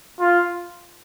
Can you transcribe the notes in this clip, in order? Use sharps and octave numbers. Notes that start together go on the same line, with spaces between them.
F4